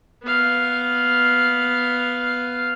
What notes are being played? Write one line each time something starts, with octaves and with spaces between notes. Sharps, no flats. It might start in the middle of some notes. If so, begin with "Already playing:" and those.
B3 F5